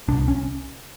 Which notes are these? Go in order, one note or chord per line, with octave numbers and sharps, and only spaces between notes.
C2 D4
C#4